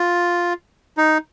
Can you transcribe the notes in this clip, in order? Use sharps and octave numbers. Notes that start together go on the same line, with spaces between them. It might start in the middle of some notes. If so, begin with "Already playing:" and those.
Already playing: F4
D#4